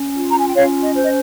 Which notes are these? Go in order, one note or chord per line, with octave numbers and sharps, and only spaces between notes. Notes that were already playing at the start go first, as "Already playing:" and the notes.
Already playing: C#4
F4
A#5
G#5
G5
C#4 C#5 F5
D#5
C5
D#5